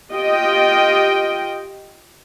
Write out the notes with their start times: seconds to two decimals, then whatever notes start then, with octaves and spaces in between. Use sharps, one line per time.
0.12 F4 G4 D#5 G5